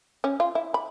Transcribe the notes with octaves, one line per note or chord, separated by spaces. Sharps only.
C#4
F4
E4
B5